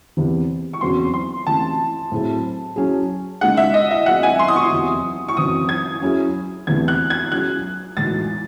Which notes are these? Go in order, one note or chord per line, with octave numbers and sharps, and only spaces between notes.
E2 C3 E3
C#6
E2 C#3 F#3 C4 F#4 C6
C6
C3 E3 A3 C#4 A5
A2 F#3 C4 E4 G#4
F#3 C#4 E4 G#4
C#3 G#3 D#4 G#4 F#5
E5
D#5
E5
F#3 C4 E4 G#4 F#5
G#5
C6
D#6
C#6
E2 C3 F#3
C#6
F#2 C#3 E3 C4 D#6
G#6
F#3 C#4 E4 G#4
E2 C3 E3 A3 G#6
F#6
G#6
F#3 C#4 G#4 F#6
A2 E3 G#3 D#4 F#4 A6